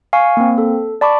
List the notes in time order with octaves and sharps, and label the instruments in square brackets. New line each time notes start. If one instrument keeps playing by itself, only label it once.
[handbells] F5 G#5 C#6
A#3 C4
A4
D5 A5 B5 C#6 D6